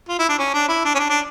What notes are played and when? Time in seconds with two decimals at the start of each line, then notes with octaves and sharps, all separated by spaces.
0.09 F4
0.19 E4
0.29 D4
0.39 C#4
0.54 D4
0.69 E4
0.85 D4
0.95 C#4
0.99 D4
1.10 D4